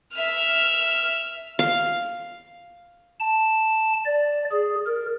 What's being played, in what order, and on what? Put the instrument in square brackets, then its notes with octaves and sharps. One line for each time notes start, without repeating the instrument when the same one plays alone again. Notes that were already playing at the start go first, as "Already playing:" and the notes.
[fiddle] E5 F6
[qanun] F5
[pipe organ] A5
D5
G#4
A#4